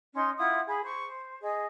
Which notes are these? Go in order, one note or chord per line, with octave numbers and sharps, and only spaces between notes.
C#4 D#4 C6
E4 F4 F#5 D#6
G#4 B5
C5 C#6
C5
G#4 D#5